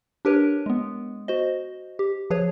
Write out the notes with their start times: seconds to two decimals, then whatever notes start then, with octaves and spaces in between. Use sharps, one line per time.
0.25 D4 G4 A#4 B4 C#5
0.66 G#3 B3
1.28 F#4 C5 D#5
1.99 G4
2.30 F3 G#4 B4 C#5